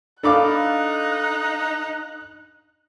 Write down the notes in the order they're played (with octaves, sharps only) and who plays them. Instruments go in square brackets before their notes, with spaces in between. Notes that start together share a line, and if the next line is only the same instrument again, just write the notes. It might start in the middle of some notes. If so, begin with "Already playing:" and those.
[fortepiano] D4 B5 D6 [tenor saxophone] D#4 [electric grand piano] A4 F5 [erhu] F#6